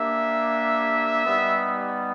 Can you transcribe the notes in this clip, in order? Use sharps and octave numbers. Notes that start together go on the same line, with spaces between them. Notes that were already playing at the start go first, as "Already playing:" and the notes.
Already playing: A#3 D4 G4 E5
G3 B3 D#4